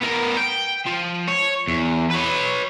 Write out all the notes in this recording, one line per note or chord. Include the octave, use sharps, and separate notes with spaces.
B3 A#4
G5
F3
C#5
E2
B4 C#5